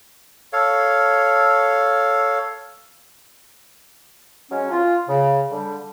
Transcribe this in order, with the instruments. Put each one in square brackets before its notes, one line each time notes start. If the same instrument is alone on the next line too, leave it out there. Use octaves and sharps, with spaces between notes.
[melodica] A4 C#5 F5
[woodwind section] F#3 G#3 C#4
F4
C#3
D3 G3